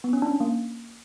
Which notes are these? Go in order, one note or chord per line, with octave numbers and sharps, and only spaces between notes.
B3
C#4
D4
C#4
A#3